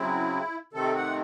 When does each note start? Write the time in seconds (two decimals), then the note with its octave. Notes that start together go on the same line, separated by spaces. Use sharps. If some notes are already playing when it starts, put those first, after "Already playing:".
Already playing: C#3 F#3 C4 E4
0.73 C3 D#3 A3 C4 A4
0.95 F#5